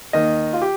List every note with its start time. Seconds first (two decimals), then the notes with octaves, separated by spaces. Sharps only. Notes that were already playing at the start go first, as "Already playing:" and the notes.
0.13 D#2 D#3 D#5
0.53 F4
0.62 G4